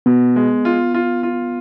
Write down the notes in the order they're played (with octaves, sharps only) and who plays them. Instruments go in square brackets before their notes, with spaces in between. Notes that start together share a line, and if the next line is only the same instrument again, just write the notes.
[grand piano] B2 [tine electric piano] B3
[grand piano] G#3
F4
F4
F4